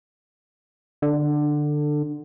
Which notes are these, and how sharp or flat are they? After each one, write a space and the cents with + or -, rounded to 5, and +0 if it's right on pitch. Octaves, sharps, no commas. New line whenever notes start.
D3 +15